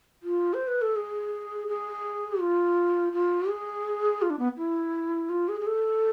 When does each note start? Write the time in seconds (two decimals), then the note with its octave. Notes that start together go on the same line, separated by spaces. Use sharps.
0.23 F4
0.54 C5
0.67 B4
0.82 A4
0.96 G#4
1.68 G#4
2.40 F4
3.13 F4
3.49 G#4
4.22 F4
4.30 D4
4.39 B3
4.58 E4
5.30 F4
5.48 G#4
5.61 G#4
5.67 A4